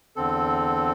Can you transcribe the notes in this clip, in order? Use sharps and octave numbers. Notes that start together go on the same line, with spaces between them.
E2 D3 C4 A4